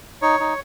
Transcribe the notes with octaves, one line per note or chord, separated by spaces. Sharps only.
D#4 C#5
D#4